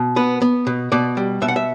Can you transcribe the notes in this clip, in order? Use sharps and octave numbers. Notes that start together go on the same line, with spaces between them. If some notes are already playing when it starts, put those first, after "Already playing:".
Already playing: B2
B3 B4
B3
B2
B2 D5
G3
B2 E5
F#5
E5